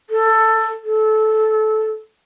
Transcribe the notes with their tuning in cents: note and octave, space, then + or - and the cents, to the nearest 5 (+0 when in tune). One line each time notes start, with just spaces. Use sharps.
A4 +15
A4 -20